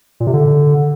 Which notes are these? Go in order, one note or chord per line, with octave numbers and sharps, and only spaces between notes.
A#2
C3
D3